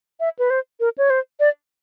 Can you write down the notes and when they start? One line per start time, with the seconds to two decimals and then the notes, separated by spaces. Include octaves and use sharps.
0.20 E5
0.39 B4
0.50 C5
0.80 A#4
0.98 C#5
1.10 C5
1.40 D5